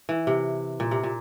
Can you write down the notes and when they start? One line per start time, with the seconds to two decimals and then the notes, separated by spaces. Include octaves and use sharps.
0.09 E3
0.27 C3
0.80 A#2
0.91 C3
1.03 A#2